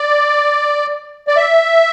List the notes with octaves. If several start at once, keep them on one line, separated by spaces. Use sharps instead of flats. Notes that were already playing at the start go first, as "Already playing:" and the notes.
Already playing: D5
D5
E5